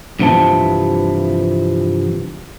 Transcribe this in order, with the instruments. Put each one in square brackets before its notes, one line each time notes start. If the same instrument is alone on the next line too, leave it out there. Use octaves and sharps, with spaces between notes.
[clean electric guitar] G2 C3 E3 F3 A5